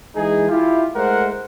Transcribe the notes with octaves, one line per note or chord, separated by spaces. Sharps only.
E3 G#3 D#4 G#4
E4 F4 G4
G#3 A3 A#4 C5 F#5